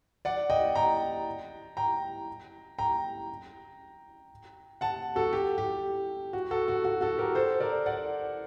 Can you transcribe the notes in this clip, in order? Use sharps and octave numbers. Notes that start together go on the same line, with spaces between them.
D5 F#5
D#5 G5
G5 A#5
G5 A#5
G5 A#5
F#5 A5
F#4 A4
G4
G4
F#4
F#4 A4
F#4
F#4
F#4 A4
G4 A#4
A4 C5
A#4 D5
D5 F#5